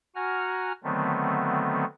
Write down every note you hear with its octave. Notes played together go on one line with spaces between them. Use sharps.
F#4 F#5 G#5 A#5 F6
D3 D#3 F#3 A3 B3 C4